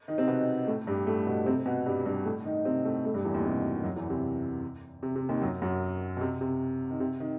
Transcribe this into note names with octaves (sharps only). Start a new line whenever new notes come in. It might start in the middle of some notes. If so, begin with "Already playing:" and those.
D#3 D#4
C3 C4
B2 B3
A2 A3
G2 G3
A2 A3
B2 B3
C3 C4
B2 B3
G2 G3
G2 G3
A2 A3
D#3 D#4
C3 C4
A2 A3
A2 A3
G2 G3
E2 E3
D#2 D#3
C3
B2
C3
F#2 F#3
E2 E3
C3
C3
C3
D#2 D#3
F#2 F#3
F#2 F#3
B2
C3
C3
D#3
C3
D#3